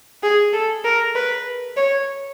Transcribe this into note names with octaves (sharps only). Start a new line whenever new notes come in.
G#4
A4
A#4
B4
C#5